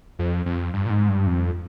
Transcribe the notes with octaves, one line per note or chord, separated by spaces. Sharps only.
F2
F2
G2
A#2
G#2
G2
F2